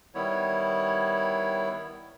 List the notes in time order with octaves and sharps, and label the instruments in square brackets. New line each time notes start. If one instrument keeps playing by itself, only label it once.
[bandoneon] D#3 G3 B3 E4 C#5